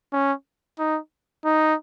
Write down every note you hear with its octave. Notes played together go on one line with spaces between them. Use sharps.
C#4
D#4
D#4